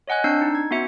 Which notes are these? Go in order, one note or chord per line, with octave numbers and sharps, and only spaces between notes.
C#5 D#5 F#5 G#5 F#6
C4 D4 E6 G6 C7
D#4
G#6
B3 C#4 F#4 E5 C#7